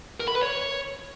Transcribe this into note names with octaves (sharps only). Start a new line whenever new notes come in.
A#4
B5
B4
C#5